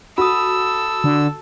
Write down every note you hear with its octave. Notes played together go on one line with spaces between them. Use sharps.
F#4 A4 B5 D#6 E6
D3